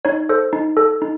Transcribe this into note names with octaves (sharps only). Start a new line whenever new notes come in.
D#4 C#5
A4 C5
D#4
A4
D#4